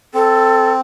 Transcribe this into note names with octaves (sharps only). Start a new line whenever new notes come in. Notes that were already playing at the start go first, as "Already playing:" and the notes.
C4 A4